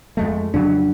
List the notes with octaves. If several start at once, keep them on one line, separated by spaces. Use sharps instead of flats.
F2 G#3 A3
F2 C#3 F#3 D4